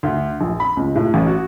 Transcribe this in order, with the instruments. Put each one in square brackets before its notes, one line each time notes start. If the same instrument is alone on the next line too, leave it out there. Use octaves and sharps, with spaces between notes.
[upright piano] D2
A#1
B5
C#2
A2
A1
F#4